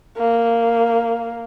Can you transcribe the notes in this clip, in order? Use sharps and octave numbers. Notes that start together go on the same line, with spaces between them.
A#3